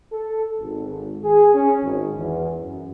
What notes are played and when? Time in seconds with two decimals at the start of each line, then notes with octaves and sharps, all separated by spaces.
0.12 A4
0.60 G#1
1.24 G#4
1.53 C#4
1.82 G#1
2.17 E2
2.61 F#2